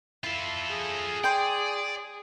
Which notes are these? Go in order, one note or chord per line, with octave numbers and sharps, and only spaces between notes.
E4 F4 A4
G#4
D5 G5 C6